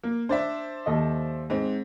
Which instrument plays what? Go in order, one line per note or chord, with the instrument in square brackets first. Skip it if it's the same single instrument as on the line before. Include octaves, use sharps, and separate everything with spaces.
[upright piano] A#3
[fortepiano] D4 [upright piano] C5 D5 E5
[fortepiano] D#2 A4 D#5
[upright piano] G#2 C4